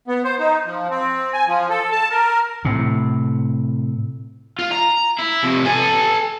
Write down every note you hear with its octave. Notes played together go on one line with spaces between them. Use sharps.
B3
C5
D#4
F3
C4
G#5
F3
A4
A5
A#4
A2 C3
F4
A#5
E4
C3 F3
A4 G#5